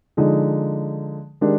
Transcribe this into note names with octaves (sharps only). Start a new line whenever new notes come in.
D3 F3 G#3 D#4 G#4
D#3 G#3 D4 G4